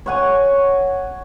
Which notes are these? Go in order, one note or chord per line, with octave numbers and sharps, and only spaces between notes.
C#5 F#5 G#5